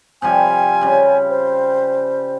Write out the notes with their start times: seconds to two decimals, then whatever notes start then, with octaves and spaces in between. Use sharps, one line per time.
0.22 C3 F3 G3 G#5
0.81 C#3 G3
1.30 C5